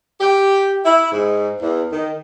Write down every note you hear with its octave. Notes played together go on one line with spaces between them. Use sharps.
G4
E4
G#2
E2
D#3